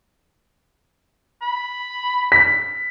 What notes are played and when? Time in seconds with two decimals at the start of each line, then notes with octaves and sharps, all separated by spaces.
1.42 B5
2.32 B6